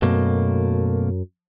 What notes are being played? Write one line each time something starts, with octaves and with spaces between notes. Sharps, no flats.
F#2 B2 A3 A#3